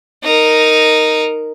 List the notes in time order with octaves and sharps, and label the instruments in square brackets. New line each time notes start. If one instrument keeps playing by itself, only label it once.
[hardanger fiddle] D#4 A#4